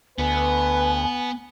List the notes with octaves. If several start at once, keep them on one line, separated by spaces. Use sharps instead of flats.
D2 B3 B4 G#5